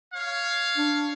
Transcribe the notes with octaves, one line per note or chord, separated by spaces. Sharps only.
C#5 F5
D4